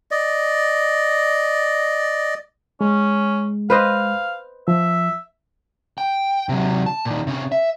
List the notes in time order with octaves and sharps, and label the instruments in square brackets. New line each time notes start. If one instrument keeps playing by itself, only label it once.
[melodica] D5 D#5
[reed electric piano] G#3 [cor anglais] C#4
[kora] B4 C5 D#5 [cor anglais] F5
[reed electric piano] F3 [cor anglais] E5
[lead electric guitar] G5
C3 F#3
A5
A#2 D#3
C3 C#4
E5